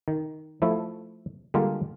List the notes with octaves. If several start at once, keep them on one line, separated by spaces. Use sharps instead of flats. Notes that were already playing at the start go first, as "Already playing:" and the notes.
D#3
F3 A3 E4
D3 G3 G#3 A#3 F4 F5